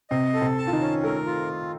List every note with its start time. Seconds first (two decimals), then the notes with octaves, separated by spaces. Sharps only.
0.10 C3 C4 D#5
0.34 A4
0.41 C3 C4
0.58 A5
0.67 F4
0.72 D#3 D#4
0.80 C#4
1.03 A3 A4 A#4
1.26 F4